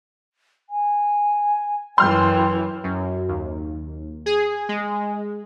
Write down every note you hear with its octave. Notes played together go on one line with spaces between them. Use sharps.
G#5
F#2 E3 G5 C6 F6 G6
F#2
D#2
G#4
G#3